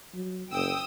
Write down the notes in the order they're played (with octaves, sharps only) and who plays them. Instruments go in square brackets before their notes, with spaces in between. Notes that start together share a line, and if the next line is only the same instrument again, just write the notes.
[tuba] F#3
[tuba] F#1 [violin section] G5 D#6 E6